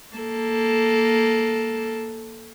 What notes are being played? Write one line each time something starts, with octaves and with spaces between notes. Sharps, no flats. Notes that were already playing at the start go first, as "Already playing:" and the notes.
A#3 A4